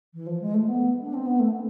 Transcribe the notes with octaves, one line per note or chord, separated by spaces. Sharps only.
E3
F3
G#3
A3
B3
D4
C4
B3
A3